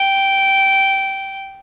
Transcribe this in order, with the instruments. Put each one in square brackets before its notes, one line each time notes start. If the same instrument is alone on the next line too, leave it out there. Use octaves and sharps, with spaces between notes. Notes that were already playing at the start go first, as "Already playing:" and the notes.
Already playing: [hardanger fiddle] G5